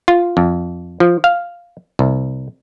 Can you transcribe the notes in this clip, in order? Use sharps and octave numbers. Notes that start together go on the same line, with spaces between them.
F4
F2
F3
F5
C2